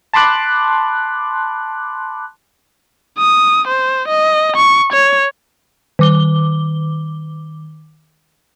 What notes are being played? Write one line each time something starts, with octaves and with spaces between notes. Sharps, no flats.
A5 B5 C6 D6 F#6
D#6
C5
D#5
C#6
C#5
D#3 D6 G7